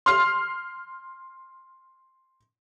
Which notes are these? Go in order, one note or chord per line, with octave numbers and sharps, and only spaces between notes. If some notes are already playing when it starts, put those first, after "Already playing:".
C6 F6 C7